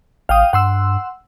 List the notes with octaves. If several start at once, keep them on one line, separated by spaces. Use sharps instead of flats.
A1 F5 G5 D#6
G2 F#5 C6 E6